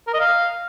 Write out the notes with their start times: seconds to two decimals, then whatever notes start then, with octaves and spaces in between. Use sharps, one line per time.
0.07 A#4
0.14 D#5
0.20 F5